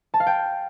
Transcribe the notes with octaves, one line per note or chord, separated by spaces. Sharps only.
A5
F5
G5